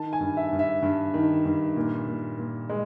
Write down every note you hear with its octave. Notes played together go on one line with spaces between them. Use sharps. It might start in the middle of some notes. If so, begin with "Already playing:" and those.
Already playing: D#3 A5
G#5
G2
E5
G2
E5
G2
D#3
G2
A#2
A#2
A#2
G#3